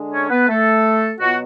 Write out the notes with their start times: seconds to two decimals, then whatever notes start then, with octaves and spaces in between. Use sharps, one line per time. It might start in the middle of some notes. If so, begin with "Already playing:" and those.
Already playing: D3 G#3 D4
0.12 C#4 C#5
0.30 B3 B4
0.48 A3 A4
1.19 B2 F#3 B3 F4 F#4